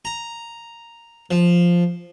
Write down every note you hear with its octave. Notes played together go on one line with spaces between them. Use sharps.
A#5
F3